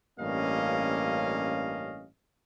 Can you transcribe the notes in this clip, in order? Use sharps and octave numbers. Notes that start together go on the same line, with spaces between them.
A1 G2 A#3 C#4 D#5 F5